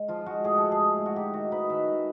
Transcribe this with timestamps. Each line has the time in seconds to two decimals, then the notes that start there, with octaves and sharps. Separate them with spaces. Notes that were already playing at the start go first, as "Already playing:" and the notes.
Already playing: G#3
0.08 F3 F4
0.26 G#3 F#4
0.44 A2 G#4
0.58 F3 A4
0.72 G#4
0.80 G#3
0.98 A2
1.06 F#4
1.16 D#4 G4
1.34 D#3 F#4
1.52 D#4 B4
1.70 D#3 E5
1.88 G#3